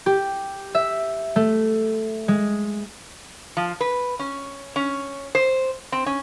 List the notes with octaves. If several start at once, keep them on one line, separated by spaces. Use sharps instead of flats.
G4
E5
A3
G#3
F3
B4
C#4
C#4
C5
C4
C#4